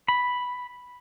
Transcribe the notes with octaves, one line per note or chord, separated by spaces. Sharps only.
B5